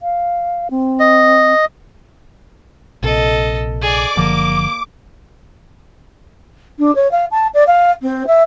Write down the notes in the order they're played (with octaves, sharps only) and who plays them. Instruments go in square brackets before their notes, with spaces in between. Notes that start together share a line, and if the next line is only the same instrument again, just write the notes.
[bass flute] F5
C4
[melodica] D#5
[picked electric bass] A#1 C3 [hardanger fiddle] A4 D#5
[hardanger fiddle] G#4 D5 [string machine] D6
[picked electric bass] F#1 D3 F3 [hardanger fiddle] A#3
[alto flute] D4
C#5
F5
A5
D5
F5
C4
E5